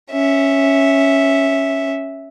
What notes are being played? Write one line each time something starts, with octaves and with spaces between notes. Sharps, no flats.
C#4 E5